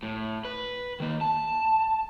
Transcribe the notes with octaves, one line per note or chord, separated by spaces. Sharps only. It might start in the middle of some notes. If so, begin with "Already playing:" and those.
A2
B4
D#3 A#3
A5